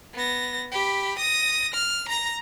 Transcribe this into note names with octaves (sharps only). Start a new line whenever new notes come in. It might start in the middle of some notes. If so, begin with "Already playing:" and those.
B3 A#6
G4 B5
D#6 A#6
F6
A#5 A#6